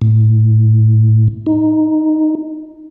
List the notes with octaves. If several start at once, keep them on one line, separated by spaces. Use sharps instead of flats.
A2
D#4